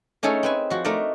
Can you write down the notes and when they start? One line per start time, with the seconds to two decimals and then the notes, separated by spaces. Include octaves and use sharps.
0.23 A3 C#4 D#4 G#4 A4
0.43 C4 B4 G#5
0.70 F3 F#4
0.85 A3 D#4 A#4 D5